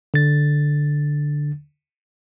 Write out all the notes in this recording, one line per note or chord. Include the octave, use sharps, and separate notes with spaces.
D3 A6